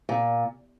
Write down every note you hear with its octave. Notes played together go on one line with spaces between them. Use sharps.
A#2